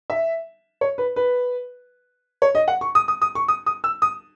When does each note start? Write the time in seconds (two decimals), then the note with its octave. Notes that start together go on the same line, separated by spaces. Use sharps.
0.10 E5
0.81 C#5
0.98 B4
1.16 B4
2.42 C#5
2.55 D#5
2.68 F#5
2.81 C#6
2.95 D#6
3.08 D#6
3.22 D#6
3.35 C#6
3.48 D#6
3.66 D#6
3.84 E6
4.02 D#6